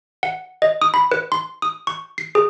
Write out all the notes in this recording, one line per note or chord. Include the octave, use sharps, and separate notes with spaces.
F#5
D#5
D#6
B5
B4
C6
D#6
C#6
C7
G#4